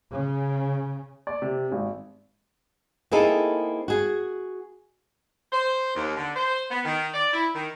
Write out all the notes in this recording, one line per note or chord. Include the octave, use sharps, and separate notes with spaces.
C#3
D5
C3
G#1
A#3 C4 D#4 E4 G#4 A4
F#4 G#4
C5
D#2
D3
C5
B3
D#3
D5
E4
D#3